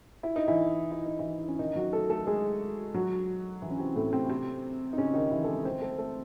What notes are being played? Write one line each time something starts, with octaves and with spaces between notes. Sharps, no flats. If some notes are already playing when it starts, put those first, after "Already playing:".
E4
D#4
E3 E4
E4
D#4
E3 E4
C#4
D#3 D#4
F#3 F#4
A3 A4
A3 A4
G#3 G#4
F#3 F#4
E3 E4
C#4
C3 C4
A2 A3
C3 C4
C3 C4
D#4
C#3 C#4
D#3 D#4
E3 E4
A4
G#3 G#4
C4 C5
A3 A4
A3 A4